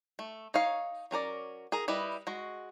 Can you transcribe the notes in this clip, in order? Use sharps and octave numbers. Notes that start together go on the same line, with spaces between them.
A3
D#4 C#5 F5
F#3 C#4 A#4 D5
G#4 A#4
G3 E4 B4 D#5
G#3 F#4